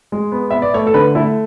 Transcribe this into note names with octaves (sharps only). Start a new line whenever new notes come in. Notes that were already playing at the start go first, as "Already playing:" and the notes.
G#3
B3
B3 E5
D5
A3 C#5
A4
D3 B4
A3 E4